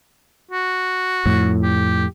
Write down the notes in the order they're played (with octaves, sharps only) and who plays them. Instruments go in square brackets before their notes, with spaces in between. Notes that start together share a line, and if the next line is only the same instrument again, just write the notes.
[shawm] F#4
[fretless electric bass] F2 A2
[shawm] G4